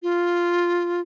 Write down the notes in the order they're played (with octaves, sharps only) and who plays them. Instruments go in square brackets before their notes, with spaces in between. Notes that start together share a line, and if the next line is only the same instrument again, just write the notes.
[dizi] F4